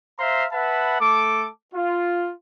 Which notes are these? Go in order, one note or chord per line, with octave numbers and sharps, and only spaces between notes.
C5 E5 F5 A#5 C6
B4 E5 F#5 A5 B5
A3 A4 D6
F4